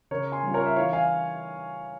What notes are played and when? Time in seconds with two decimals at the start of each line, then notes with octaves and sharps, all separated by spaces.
0.11 C#3 A#4 C#5
0.32 G#5 C6
0.43 G3 C#4 F4
0.54 A#4 C#5
0.66 E5
0.76 E3 C#5 F5
0.93 F5 G#5